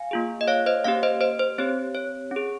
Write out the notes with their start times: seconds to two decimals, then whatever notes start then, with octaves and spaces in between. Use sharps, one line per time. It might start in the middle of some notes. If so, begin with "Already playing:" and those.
Already playing: F5 G#5
0.11 A#3 F4 G#4
0.41 D#5
0.48 C#5 F5
0.66 C5 D#5
0.85 A#3 C#4 G4 C#5 F5
1.03 C5 D#5
1.21 C5 D#5
1.39 C5
1.58 C4 G4 C#5
1.95 C#5
2.31 C#4 G#4